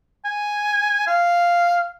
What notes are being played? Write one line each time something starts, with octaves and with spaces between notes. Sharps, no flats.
G#5
F5